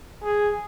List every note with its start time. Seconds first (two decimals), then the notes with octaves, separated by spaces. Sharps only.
0.23 G#4